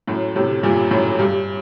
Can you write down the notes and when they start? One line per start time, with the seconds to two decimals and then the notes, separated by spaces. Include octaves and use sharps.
0.07 F#2 A2
0.36 A2 C3
0.63 G2 A#2
0.91 F#2 A2
1.19 G2